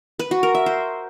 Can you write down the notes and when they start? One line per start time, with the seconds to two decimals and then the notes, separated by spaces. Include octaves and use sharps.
0.19 B4
0.31 F#4
0.43 A#4
0.55 E5
0.66 C5